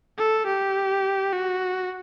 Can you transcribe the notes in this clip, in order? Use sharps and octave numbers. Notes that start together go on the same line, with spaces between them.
A4
G4
F#4